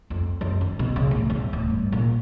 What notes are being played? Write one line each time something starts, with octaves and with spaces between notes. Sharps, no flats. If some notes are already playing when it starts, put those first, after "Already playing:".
F2
F#2
D#3
B2
C#3
A1
E2
D1
G2
A#2